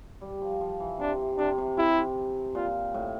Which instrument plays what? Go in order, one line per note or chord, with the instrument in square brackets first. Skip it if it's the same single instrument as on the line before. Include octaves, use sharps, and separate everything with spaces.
[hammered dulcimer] G3
F3
F3
E3
[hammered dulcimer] C3 [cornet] D4
[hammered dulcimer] C3 [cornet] D4
[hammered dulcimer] C3
[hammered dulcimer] C3 [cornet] E4
[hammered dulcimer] A#2 [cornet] F4
[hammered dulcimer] A2